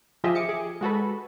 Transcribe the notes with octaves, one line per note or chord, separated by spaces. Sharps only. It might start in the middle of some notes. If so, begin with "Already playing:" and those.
F3 F4 G4 G#4 D#5 E5
D6 C#7
G#4
G#3 F#4 A4 B4